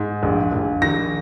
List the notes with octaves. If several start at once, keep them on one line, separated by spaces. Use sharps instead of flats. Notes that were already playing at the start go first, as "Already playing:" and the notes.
Already playing: G#2
A#1
A#1
D#3 A#6